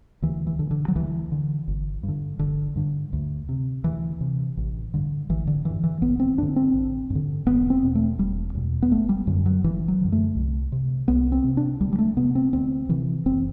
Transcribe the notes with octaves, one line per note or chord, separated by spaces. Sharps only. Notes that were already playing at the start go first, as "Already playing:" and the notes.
D2 E3
E3
D3
D3
F#3
D2 E3
D3
G1
G2
D3
G1 D3
G2 D3
D2
C3
D2 E3
C3
A1
G2 D3
A1 E3
D3
G2 D3 E3
E3
A1 B3
C4
G2 D3 D4
C4
A1
G2 D3
E1 B3
C4
E2 B2
A3
E1 G3
E2 B2
B3
G1 A3
G3
F#2 D3
F#3
G1 E3
F#3
F#2 D3
A3
C2
C3
C2 B3
C4
C3
D4
D2 G3
G3
A3
C3 B3
C4
D2 C4
C3 E3
F#1 C4